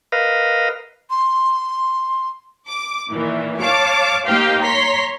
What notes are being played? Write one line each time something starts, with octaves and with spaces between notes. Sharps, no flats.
A#4 B4 D#5 F5
C6
D6
A#2 D#3 E3
C#5 F5 A5 D6
A#3 D#4 G4 C5 F5 G5
C#5 A#5 C6 B6